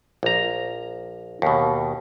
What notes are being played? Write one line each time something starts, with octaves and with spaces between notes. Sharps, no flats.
A#1 A#5
D#2 B2